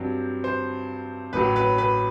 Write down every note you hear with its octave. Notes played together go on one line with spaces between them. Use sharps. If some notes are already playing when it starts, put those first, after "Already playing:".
Already playing: G2 F#3 C4
C5
A1 A2 F#3 B4
B4
B4